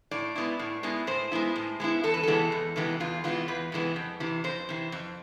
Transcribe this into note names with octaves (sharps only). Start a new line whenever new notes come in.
A2 D5
G#3 B3 E4
A2
G#3 B3 E4
A2 C5
G#3 B3 E4
A2
G#3 B3 E4
E2 A4
B4
C3 E3 G#3 B3 A4
E2
C3 E3 G#3 B3
E2 F4
C3 E3 G#3 B3 F4
E2 B4
C3 E3 G#3 B3
F2
C3 E3
F2 C5
C3 E3
F2